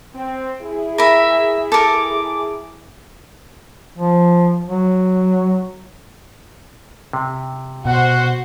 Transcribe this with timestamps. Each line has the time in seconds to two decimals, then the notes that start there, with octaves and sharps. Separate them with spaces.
0.14 C4
0.61 E4 G#4
0.98 A#4 E5 B5
1.72 A4 A#4 D6
3.98 F3
4.68 F#3
7.13 C3
7.85 B2 F#4 C5 F#5